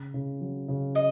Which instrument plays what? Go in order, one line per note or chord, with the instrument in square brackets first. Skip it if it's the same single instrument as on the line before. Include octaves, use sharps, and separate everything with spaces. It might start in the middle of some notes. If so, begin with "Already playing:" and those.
Already playing: [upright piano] C#3
C#3
F#3
C#3
[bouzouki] D#5